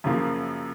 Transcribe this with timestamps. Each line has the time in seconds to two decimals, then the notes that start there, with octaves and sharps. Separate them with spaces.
0.04 F#2 C#3 F3 A#3